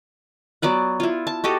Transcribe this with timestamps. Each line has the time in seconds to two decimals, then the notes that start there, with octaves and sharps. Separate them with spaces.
0.62 F#3 B3 D5 F#5
1.00 E4 F4
1.27 A5
1.44 F#4 G4 A4 D#5